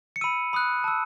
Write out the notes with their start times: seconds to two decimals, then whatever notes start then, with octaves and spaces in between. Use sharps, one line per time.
0.16 C#7
0.21 B5 E6 D#7
0.53 B5 D#6 F#6
0.84 A5 E6